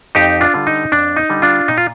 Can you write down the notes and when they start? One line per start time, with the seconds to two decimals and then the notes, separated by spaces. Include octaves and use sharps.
0.15 F2 D#4 G4
0.41 D4 F4
0.54 D3 G3 D4
0.67 D#4
0.92 F2 D4
1.17 D#4
1.30 D3 G3 D4
1.42 D4 F4
1.68 A#2 D#4
1.78 F4